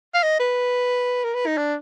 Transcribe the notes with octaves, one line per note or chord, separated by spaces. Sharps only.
F5
D#5
B4
A#4
B4
D#4
D4